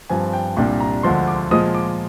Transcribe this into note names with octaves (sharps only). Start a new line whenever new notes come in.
G2 F3 C4 G#5
G5
C2 A#2 G3 D4 G5
A#5
D2 D3 F3 G#3 C6
D6
A#2 F3 G#3 D#6
D6